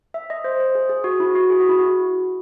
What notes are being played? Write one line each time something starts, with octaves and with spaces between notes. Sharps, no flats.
E5
D#5
C5
C5
G#4
G#4
F#4
E4
F#4
G#4
F#4
E4
F#4